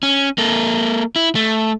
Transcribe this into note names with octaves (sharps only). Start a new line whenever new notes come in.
C#4
A#3 A4
E4
A3